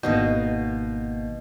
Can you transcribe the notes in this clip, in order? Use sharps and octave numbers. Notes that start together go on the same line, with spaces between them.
G#1 B2 A#3 D#4 D#5 G6